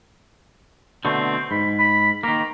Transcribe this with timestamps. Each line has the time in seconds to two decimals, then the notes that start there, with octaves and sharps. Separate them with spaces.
1.05 B2 D3 A3 C4
1.51 G#2 B5
1.79 B5
2.23 D#3 A#3 A#5